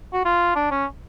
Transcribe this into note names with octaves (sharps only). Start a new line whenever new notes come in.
F#4
F4
D4
C#4